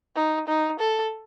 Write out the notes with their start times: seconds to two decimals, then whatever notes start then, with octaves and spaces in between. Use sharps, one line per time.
0.16 D#4
0.47 D#4
0.79 A4